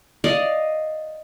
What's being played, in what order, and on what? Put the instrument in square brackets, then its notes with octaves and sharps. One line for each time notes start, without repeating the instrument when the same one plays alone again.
[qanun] D5 D#5 F5